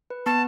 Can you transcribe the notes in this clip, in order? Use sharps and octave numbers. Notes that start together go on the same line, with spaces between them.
B4
B3 A5